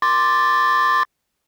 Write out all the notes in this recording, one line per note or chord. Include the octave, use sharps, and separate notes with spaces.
C6 D6 A6